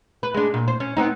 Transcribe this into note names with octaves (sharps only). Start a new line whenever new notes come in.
B4
G#3 D4
A#2
C5
C#4
B3 C4 D#4